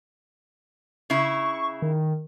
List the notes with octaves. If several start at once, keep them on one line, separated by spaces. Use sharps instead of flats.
C#3 E4 C#6
D#3